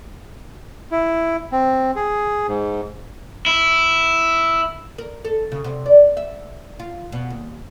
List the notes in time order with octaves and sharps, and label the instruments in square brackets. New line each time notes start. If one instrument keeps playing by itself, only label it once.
[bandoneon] E4
C4
G#4
G#2
[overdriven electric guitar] E4
[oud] A#4
A4
C#3
C3
D5
E5
F4
B2
D#2